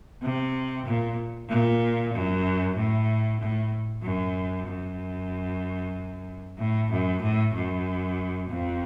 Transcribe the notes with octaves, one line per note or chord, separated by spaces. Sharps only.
C3
A#2
A#2
F#2
A2
A2
F#2
F#2
A2
F#2
A2
F#2
F2